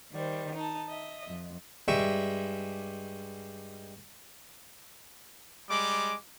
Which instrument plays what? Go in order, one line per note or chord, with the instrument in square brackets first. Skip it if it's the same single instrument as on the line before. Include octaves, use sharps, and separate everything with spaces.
[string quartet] D#3 G3 C5
D#4 A5
D#5 E5
F2
[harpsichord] G2 G3 G#3 E5 G5 C#6
[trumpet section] G3 G#3 D6